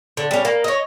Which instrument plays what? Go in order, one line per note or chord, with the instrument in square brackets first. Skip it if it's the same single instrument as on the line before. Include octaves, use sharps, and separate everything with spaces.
[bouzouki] D3
G3 C#4
A#3
C#5 D#5